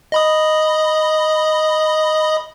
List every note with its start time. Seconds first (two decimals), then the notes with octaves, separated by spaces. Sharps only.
0.12 D#5 B5 D#6